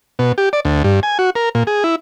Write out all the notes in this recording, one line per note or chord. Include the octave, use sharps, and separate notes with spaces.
B2
G4
D5
D2
G2
G#5
F#4
A#4
A#2
G#4
E4